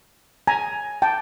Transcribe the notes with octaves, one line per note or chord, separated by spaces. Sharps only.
G#5 A#5
G5 A5